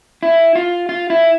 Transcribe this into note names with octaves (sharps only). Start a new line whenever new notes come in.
E4
F4
F4
E4